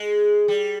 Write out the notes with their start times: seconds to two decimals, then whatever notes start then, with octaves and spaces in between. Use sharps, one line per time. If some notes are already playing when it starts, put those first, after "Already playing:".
Already playing: G#3
0.48 G3